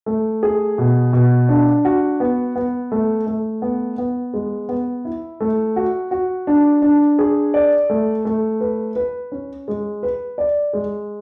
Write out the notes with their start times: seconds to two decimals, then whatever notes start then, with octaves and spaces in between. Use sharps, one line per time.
0.06 A3
0.43 G#4
0.78 B2
1.13 B2
1.49 D4
1.85 F#4
2.20 B3
2.56 B3
2.92 A3
3.27 A3
3.62 B3
3.98 B3
4.34 G#3
4.69 B3
5.05 E4
5.41 A3
5.76 F#4
6.11 F#4
6.47 D4
6.82 D4
7.19 G#4
7.54 D5
7.90 A3
8.25 A3
8.60 B4
8.96 B4
9.32 C#4
9.68 G#3
10.03 B4
10.38 D5
10.73 G#3